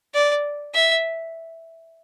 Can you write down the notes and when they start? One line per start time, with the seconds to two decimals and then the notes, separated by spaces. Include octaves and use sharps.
0.14 D5
0.75 E5